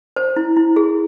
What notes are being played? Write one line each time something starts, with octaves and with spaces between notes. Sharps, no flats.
C5
E4
E4
G#4